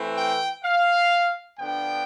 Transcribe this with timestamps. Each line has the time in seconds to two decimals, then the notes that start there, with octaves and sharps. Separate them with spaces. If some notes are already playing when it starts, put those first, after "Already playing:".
Already playing: E3 A3 C4
0.17 G5
0.64 F5
1.59 D3 F3 B3 D4 G5